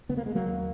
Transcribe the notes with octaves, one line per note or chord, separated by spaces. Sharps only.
C#3 B3
A#3
G#3
F#3 A#3
D#2